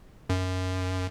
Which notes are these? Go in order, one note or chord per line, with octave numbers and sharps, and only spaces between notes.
F#2